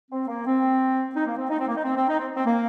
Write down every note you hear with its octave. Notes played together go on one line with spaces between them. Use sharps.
C4
A#3
C4
D#4
A#3
C4
D#4
C4
A#3
D#4
C4
C4
D#4
C4
C4
A#3